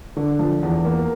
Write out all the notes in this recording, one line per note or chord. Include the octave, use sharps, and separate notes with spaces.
D3
F3
E2
A#3